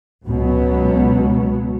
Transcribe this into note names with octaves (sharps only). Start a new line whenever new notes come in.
C#2 B2 F#3 B3